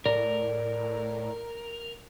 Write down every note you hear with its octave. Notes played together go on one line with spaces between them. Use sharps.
A2 A#4 D5